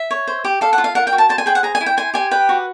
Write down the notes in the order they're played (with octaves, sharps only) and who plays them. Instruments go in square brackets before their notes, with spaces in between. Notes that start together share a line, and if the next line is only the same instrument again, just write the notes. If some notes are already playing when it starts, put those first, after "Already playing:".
Already playing: [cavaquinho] E5
C#5
C5
G4
A4 F5
F#5
F4
F5
A#4 F#5
G5
F#4
A5
C5 A5
G#5
G#4 G5
F#5
G#4 A#5
G#5
E4
G5
C5 G#5
G4 G#5
B4 G5
F#4